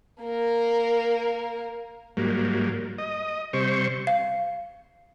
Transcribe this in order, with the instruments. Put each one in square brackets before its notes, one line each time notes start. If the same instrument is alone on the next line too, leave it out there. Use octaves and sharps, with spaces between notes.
[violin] A#3 A#4
[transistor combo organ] G#2 F#3 G3 A#3
D#5
C3 G3 C5 C#6
[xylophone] F5